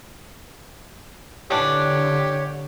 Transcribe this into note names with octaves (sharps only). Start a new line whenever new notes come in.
D3 E3 D4 G4 C#5